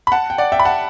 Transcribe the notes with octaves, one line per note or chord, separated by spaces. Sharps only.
B5
F#5 A5
G5
D5 F#5
E5 G5
B5
F#5 A5